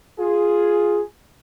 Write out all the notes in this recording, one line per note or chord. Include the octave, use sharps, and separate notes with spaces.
F4 G#4